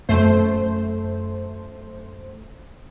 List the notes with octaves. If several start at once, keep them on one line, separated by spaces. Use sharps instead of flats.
F#2 A3 C5